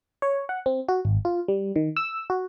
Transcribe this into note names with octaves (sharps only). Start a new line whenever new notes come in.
C#5
F#5
C4
F#4
G#1
F4
G3
D#3
E6
F#4